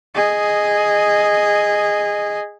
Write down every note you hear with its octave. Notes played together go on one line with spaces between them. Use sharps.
G#4 D#5